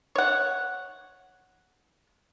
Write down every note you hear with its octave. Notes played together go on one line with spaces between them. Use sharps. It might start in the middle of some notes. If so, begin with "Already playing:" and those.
C#5 F#5